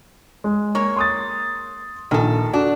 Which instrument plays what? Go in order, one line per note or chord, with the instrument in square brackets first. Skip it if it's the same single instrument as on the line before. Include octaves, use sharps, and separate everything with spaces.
[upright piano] G#3
[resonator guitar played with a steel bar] A#3 C#5
[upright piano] C6 D#6 A6
[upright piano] A#1 [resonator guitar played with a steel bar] D#3 A4
[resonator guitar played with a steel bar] D4 [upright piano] F#4